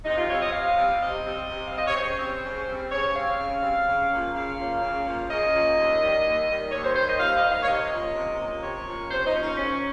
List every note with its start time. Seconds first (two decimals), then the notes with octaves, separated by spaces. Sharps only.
0.05 C3 D#4
0.17 F4
0.29 G3 C4 C#5
0.40 D#5
0.53 C3 F5
0.76 G3 C4
1.00 C3 D#5
1.24 G3 C4
1.48 C3
1.67 G3 C4 F5
1.76 D#5
1.87 C#5
1.95 C#3 C5
2.19 G3 C4
2.44 C#3
2.66 G3 C4
2.91 C#3 C#5
3.14 G3 C4 F5
3.38 C#3
3.62 G3 C4
3.87 C#3
4.10 F3 A#3 C#4
4.34 C#3 F5
4.57 F3 A#3 C#4
4.81 C#3
5.05 F3 A#3 C#4
5.29 C#3 D#5
5.52 F3 A#3 C#4
5.77 D#2
6.00 D#3 G3
6.24 D#2
6.49 D#3 G3
6.71 D#2 C#5
6.84 C5
6.95 D#3 G3 C5
7.08 D#5
7.20 D#2 F5
7.36 D#5
7.43 D#3 G3
7.51 F5
7.62 C#5
7.67 C3 D#5
7.90 F3 A#3 C#4
8.15 C3
8.39 F3 A#3 C#4
8.62 C3 C#5
8.86 F3 A#3 C#4
9.10 C3 C5
9.26 D#4
9.34 F3 A#3 C#4
9.41 D#4
9.57 G#2 C#4